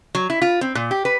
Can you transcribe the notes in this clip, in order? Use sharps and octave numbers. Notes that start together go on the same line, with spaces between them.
F#3
E4
F4
C4
A#2
G4
B4